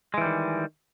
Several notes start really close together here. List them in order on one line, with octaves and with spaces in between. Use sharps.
G#3 E3 G3 D#3